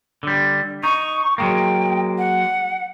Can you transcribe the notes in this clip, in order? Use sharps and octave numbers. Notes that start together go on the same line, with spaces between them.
D3 G3
D#4 C#6
F#3 G#3 A#3 G5
F#5